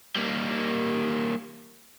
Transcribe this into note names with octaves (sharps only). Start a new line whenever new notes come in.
G3 A#3